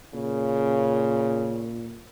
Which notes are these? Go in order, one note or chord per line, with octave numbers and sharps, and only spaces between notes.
A#2 C#3